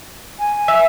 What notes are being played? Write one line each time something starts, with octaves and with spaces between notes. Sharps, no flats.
G#5
E5